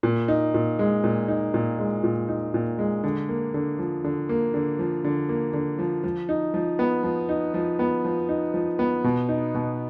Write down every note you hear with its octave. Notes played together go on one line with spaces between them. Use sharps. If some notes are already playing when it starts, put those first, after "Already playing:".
A#2
D#4
A#2
G#3
A#2
D#4
A#2
G#3
A#2
D#4
A#2
G#3
D3
A#3
D3
F3
D3
A#3
D3
F3
D3
A#3
D3
F3
F3
D#4
F3
B3
F3
D#4
F3
B3
F3
D#4
F3
B3
B2
D#4
B2